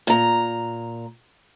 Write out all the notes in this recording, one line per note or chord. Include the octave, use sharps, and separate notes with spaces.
A#2 A#5